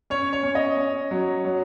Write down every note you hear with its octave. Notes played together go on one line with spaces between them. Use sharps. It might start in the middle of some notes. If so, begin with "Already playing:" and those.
C#4 C#5
C#5
C#4
D#5
C#4
F#3
F#3